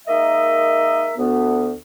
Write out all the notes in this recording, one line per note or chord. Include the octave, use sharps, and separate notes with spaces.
G#3 A#3 D#4 A#4 D#5 E5
D2 B3